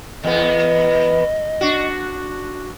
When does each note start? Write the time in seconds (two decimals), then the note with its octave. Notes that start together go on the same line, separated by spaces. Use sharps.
0.23 E2 B3 D#5
1.61 D4 F#4